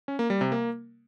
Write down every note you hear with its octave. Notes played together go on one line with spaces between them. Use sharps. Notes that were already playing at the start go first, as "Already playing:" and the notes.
C#4
A#3
G3
C3
A#3